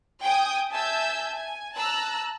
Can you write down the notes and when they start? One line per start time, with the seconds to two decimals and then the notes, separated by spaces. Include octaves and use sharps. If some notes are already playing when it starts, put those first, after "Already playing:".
0.23 G5 G#5 D#6
0.71 E5 G#5 A5 E6 G6
1.34 G#5
1.76 A5 A#5 E6 F#6